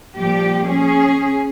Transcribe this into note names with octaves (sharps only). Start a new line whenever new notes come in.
A#2 F3 G3 G4
C#4 G#4